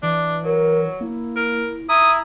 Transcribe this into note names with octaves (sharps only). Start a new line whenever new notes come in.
E3 D4
F#3 A#4
A#3 E4
A#4
E4 A#5 D#6